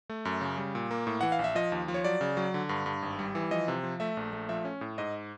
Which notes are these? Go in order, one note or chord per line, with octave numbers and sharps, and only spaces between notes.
A3
F#2
C#3
G3
A#2
A#3
A2
E3 F#5
F5
A#1
E5
F3 D#5
D#2
F3
C#5
F#3 D5
C#3
F#3
D3
G2
G2
G#1
G3
E3
F3 D#5
C3
F3
A3 E5
A#1
A3
F3 E5
C#4
A2
G#2 D#5